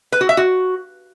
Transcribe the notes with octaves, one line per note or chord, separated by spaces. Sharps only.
B4
F#4
E5
F#4